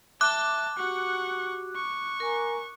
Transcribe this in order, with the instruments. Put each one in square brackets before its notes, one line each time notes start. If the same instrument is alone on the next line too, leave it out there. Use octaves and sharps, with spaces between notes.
[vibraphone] E5 [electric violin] A5 [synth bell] D6 F#6
[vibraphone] F#4 G4 [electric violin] F#5 C#6
[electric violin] C#6
[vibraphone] A#4 G#5 A#5